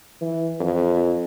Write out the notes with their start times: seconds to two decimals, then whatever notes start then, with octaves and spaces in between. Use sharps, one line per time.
0.21 E3
0.60 F2